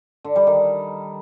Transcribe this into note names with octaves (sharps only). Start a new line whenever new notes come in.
D3
G3
D#3